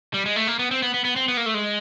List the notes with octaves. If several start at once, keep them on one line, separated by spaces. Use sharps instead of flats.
G3
G#3
A3
A#3
B3
C4
B3
B3
B3
C4
B3
A#3
A3
G#3